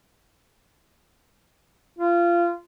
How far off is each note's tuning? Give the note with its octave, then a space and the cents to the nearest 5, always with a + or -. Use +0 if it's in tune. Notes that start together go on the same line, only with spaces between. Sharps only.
F4 -20